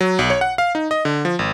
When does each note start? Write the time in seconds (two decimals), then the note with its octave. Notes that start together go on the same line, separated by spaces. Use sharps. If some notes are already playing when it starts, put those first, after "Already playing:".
0.01 F#3
0.19 B1
0.30 C#5
0.41 F#5
0.58 F5
0.75 D#4
0.91 D#5
1.05 D3
1.25 F3
1.39 G#1